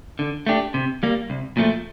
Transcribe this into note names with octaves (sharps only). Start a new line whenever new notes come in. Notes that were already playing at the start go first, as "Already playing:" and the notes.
D3
A3 D4 G4
C3
G3 A#3
C2
A#2 F3 A3